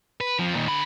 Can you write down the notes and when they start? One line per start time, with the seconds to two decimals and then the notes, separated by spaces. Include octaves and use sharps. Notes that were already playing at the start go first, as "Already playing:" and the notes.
0.21 B4
0.39 F2 F3
0.55 A#2 D#3
0.67 D3 B5